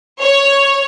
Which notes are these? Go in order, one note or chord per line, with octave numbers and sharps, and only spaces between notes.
C#5